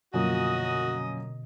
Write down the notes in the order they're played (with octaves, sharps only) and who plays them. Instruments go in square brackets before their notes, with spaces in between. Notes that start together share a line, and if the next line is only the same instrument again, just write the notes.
[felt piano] F#2 F3 A#3 [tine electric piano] B2 D3 [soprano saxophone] F#4 [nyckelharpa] D#5 D#6